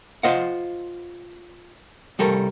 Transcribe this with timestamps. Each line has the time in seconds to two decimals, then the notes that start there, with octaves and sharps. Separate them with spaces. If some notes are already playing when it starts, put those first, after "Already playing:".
0.23 F4 C5 D#5 F5 F#5
2.19 C2 G3 A4 A#4